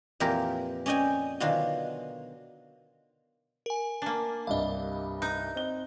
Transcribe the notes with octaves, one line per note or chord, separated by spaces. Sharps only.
F2 A#2 E3 G4 A#4
C#4 D5 D#5 G5 G#5
B2 D3 D#3 F#3 D4 F4
A#4 G#5
A#3 D4
C2 G2 D#5 F5
D#4 A#5 F#6
C4 D#5 G7